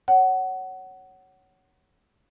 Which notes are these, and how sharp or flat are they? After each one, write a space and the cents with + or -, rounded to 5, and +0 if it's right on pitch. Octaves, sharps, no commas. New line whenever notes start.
C#5 +0 F#5 +20